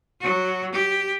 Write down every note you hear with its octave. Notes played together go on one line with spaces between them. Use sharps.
F#3 F#4
G4